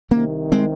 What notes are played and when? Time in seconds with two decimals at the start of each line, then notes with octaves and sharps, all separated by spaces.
0.11 C2 C3 D#3 A#3 C#4
0.52 G#3 C4